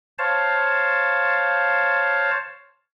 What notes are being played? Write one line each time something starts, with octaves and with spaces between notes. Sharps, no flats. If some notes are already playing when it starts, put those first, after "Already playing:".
C5 C#5 F5 A5